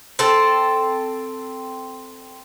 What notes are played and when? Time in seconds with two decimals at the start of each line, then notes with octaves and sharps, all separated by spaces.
0.19 C4 A4